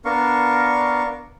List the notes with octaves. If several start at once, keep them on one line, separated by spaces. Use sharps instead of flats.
B3 D4 A#4 F5 C#6